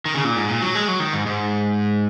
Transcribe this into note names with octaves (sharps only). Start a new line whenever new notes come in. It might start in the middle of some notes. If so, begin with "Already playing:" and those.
D#3
C#3
A#2
G#2
A#2
F#3
G#3
F#3
D#3
G#2
G#2